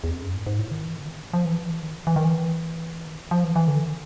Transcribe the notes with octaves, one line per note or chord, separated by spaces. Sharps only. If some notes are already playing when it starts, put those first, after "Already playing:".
E2
F2
F#2
G#2
G#2
A2
D#3
E3
D3
D#3
F3
E3
F3
E3
D#3
E3
D#3
E3
D#3
F3
E3
E3
D3
D#3